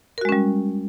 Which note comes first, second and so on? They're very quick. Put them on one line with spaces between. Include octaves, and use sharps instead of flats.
A#4 F#4 G#3 C#4 G3